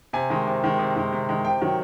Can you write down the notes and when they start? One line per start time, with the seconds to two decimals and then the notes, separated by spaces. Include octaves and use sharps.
0.13 C3 G#5
0.30 D#3 G#3
0.47 C3
0.64 D#3 G#3
0.79 C3
0.96 D#3 G#3
1.12 C3
1.29 D#3 G#3
1.45 C3 G5
1.61 D#3 F#3